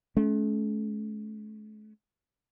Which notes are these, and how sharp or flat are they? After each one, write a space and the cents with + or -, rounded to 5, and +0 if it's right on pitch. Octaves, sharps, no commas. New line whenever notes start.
A3 -45 C#4 +15